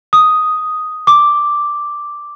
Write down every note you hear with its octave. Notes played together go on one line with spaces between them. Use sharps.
D#6
D6